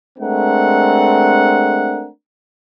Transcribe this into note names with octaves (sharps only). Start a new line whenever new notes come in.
G#3 A3 C4 D4 A#4 F#5